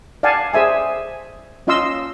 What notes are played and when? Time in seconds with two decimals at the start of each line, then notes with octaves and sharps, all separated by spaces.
0.23 D5 F5 F#5 G#5 A5
0.53 G#4 C5 E5 G#5
1.67 C#4 F4 D#5 F5 C6 E6